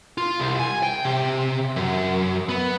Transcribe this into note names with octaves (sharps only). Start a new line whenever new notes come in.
F4
C2
G#5
G5
C3
F#2
B3